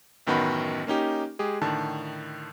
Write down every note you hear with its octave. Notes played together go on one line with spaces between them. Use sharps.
A1 F#2 D#3 B3 F#4 B5
A#3 C#4 D#4 G4
G#3 G4 G#4
A2 D3 D#3 A5